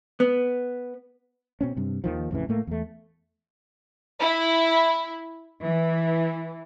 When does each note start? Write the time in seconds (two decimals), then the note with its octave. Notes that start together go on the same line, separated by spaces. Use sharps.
0.20 B3
1.61 B2 C4 C#4
1.77 G2 C3
2.04 D#2 D#3 F3
2.31 A1 F2 C#3 E3
2.49 A2 A3 A#3
2.67 E2 A3
4.19 E4
5.63 E3